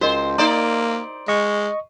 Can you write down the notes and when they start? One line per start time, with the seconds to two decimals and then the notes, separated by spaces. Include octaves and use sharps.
0.01 C#2 F#4 A#4 C5 D#5
0.38 A#3 D#4 C5 D5 A#5
1.28 G#3 D#5 C#6